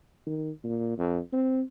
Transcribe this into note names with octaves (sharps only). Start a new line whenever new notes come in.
D#3
A#2
F2
C4